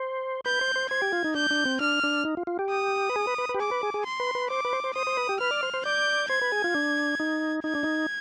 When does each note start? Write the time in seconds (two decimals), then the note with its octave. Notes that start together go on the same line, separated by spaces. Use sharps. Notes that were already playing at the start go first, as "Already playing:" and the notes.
Already playing: C5
0.46 B4 G6
0.61 C5
0.76 C5
0.90 C5 G#6
1.02 G4
1.13 F4
1.24 D#4
1.35 D4 G6
1.51 D4
1.65 C4
1.80 D4 F6
2.03 D4
2.25 D#4
2.37 F4
2.47 F4
2.59 G4
2.70 D#6
3.10 B4
3.16 G#4
3.27 B4
3.38 B4
3.49 B4
3.55 G4
3.60 G#4 D6
3.71 B4
3.83 G#4
3.94 G#4
4.05 C6
4.20 B4
4.35 B4
4.50 C5 D6
4.65 B4
4.73 C5
4.84 C5
4.95 C5 D#6
5.07 C5
5.17 B4
5.29 G4
5.40 B4 F6
5.51 D5
5.63 C5
5.74 C5
5.85 D5 G6
6.29 C5 G#6
6.42 B4
6.52 G#4
6.64 F4
6.75 D4
7.20 D#4
7.64 D#4 G#6
7.75 D4
7.83 D#4